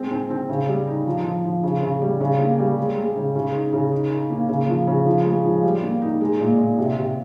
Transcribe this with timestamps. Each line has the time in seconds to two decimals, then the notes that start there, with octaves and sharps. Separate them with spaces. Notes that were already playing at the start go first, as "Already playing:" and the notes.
Already playing: G#3 C4
0.11 C4
0.30 C4
0.49 C#3
0.68 G3
0.87 D#4
1.06 F3
1.25 F3
1.44 F3
1.63 C#3
1.82 C#3
2.02 G3
2.21 C#3
2.39 A#3
2.59 G3
2.78 G#3
2.97 G#3
3.16 C#3
3.35 C#3
3.54 D#4
3.73 C#3
3.92 D#4
4.11 D#4
4.30 A#3
4.49 C#3
4.68 F3
4.87 C#3
5.06 F3
5.25 G#3
5.44 F3
5.63 G3
5.82 A#3
6.02 D#4
6.21 G#3
6.40 A#2
6.58 A#2
6.78 C3
6.97 C3